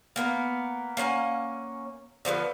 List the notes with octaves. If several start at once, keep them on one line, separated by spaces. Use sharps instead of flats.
A#3 B3 A#4
A#3 C#4 F#5 G#5
D3 F3 G#3 B3